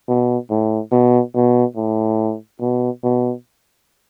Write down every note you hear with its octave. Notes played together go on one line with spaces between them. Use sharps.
B2
A2
B2
B2
A2
B2
B2